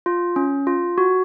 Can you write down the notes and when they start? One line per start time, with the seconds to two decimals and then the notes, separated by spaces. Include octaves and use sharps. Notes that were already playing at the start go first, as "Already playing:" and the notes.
0.06 F4
0.36 C#4
0.67 F4
0.98 F#4